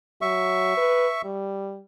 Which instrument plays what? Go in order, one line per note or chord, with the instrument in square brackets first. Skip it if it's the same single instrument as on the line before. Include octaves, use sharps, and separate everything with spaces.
[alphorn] F#3 [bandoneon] E5 C#6
[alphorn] B4
G3